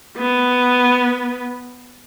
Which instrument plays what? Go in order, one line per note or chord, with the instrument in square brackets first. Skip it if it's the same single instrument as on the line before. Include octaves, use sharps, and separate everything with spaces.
[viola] B3